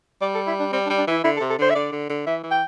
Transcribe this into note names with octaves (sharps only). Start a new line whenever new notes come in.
G3 D5
A4
E4
D4
G3 C4
D4
G3
D4
E3 E4
D3 E4
A4
C3
A4
D3 C5
E5
D3 D5
D3
D3
E3 E5
E3
G5